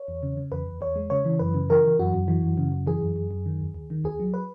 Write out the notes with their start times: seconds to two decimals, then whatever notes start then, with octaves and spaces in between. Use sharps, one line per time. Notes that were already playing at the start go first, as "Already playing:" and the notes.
Already playing: C#5
0.08 E2
0.23 C#3
0.37 C#3
0.52 E2 B4
0.67 E2
0.81 E2 C#5
0.96 G#3
1.10 C#3 C#5
1.25 E3
1.39 F#2 B4
1.54 C#3
1.69 E3 A#4
1.85 E3
1.99 F#2 F#4
2.14 F#2
2.28 E3
2.43 F#2
2.57 C#3
2.72 F#2
2.87 E3 G#4
3.01 F#2
3.16 F#2
3.31 F#2
3.46 D#3
3.61 D#2
3.74 D#2
3.90 D#3
4.04 D#2 G#4
4.20 F#3
4.34 B4